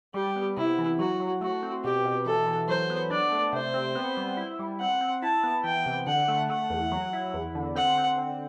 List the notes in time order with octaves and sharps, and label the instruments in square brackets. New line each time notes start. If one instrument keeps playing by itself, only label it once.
[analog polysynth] G3 [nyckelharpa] G4
[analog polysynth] B3
[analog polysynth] C3 [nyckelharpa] E4
[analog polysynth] E3
[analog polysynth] F#3 [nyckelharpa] F#4
[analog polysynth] F#3
[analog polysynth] A3 [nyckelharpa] F#4
[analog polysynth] C4
[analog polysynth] B2 [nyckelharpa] G4
[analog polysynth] B2
[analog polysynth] E3 [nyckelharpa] A4
[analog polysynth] E3
[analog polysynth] F#3 [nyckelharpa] C5
[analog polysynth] B3
[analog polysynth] D4 [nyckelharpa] D5
[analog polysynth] A3
[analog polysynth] C3 [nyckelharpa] C5
[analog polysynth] C4
B3
G3
E4
G3
[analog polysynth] C4 [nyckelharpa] F#5
[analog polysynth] C4
[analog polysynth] E4 [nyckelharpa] A5
[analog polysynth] B3
[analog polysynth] E3 [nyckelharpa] G5
[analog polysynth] C3
[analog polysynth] D3 [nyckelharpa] F#5
[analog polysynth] A3
[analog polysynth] A3 [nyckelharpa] F#5
[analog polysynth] E2
F#3
E4
E2
D3
[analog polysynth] C4 [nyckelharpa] F#5
[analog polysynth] C4
D3